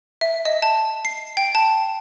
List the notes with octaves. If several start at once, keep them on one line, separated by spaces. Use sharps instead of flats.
E5
D#5
A5
C7
G5
A5